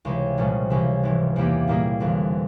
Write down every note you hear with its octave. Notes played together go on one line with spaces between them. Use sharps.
C#2 C3 E3 G#3 E4
C2 A#2 F3 G#3 C#4
C#2 C3 E3 G#3 E4
G#1 G#2 E3
E2 E3 A#3 E4 G4
A#2 G3 A#3 E4 G#4
G1 F2 E3